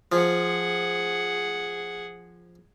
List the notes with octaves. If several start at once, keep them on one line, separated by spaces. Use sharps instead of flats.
F3 G#4 F#5